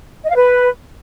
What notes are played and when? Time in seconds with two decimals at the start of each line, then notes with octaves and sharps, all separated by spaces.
0.24 D#5
0.29 F5
0.35 B4